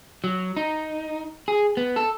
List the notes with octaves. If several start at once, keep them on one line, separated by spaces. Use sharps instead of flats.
F#3
D#4
G#4
B3
A4